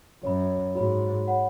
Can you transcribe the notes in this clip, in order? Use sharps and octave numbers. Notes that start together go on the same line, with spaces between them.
F#2 C#5 B5
G#2 F#4 C#5 B5
C#5 F#5 B5